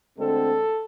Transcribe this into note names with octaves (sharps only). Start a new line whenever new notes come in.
D2 D3 G#3 C4 A4